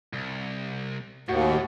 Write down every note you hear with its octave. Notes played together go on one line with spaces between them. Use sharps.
C2
D#2 A2 F#4